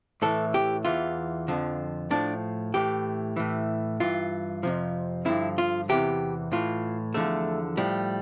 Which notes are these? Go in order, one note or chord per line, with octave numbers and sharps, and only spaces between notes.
A2 E3 A4
G4
E2 E3 F4
F2 D3 F3
A2 F3 D4
A2 E3 G4
A2 E3
G2 E3 F4
F2 C3 F3
G2 D3 F3 E4
F4
E2 C3 E3 G4
A2 E3 F4
E2 D3 F3 A3
A2 F3 G3